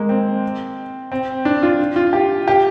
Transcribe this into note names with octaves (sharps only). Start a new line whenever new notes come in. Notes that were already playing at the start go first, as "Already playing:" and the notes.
Already playing: G#3 A#3
C4
C4
D4
F4
F4
G4
G4